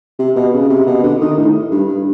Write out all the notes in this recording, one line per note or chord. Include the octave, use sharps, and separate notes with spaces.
C3
B2
C#3
C3
B2
D3
D#3
A2
G2
G2